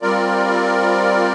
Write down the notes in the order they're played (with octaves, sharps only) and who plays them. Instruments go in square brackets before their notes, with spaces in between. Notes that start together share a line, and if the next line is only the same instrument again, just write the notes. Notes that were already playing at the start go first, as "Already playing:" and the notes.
[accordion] G3 C4 F4 A#4 D5